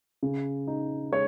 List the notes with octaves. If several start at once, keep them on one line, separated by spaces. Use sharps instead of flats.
C#3
D#4
G#3 C#5